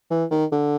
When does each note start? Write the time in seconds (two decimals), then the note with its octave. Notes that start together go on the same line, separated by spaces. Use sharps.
0.11 E3
0.31 D#3
0.52 D3